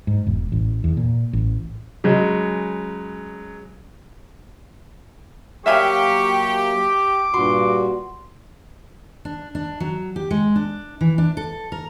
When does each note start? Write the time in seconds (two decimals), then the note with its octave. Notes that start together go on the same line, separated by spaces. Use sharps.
0.07 G#2
0.27 E1
0.52 A1
0.84 E2
0.97 A#2
1.33 A1
2.04 C#3 F#3 G#3
5.66 F#3 A#3 G4 E5 F5 G#5 C#6
6.72 D6
7.34 G2 A#2 F#4 C6
9.25 D4
9.55 D4
9.80 F#3
10.16 G4
10.31 G#3
10.56 D4
11.01 E3
11.18 D4
11.37 A4
11.72 A#4